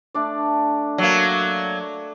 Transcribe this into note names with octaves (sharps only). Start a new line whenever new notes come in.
A3 D4 D5
F#3 A#3